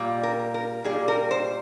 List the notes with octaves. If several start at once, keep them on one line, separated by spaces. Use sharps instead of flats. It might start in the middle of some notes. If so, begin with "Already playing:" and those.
Already playing: A#2 G3
A#4
A#4
A#2 G3 G#4
A#4
C5